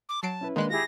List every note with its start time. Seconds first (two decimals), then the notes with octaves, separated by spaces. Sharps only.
0.09 D6
0.23 F#3 A5 C7 D7
0.41 C#4 E4 B4
0.56 D#3 G#3 A#3 D4 B4 C6 F#6
0.70 E4 F4 G4 G#4 A#6